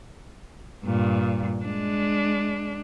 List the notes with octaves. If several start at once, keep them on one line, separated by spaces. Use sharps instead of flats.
G2 A#2
G#3 D4